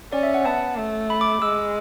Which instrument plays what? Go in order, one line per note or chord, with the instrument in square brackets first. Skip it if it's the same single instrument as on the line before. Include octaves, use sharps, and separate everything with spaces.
[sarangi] C#4 [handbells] D5
[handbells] E5
F#5
[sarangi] B3 [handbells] A5
[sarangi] A3
[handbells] B5
D6
[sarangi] G#3 [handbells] E6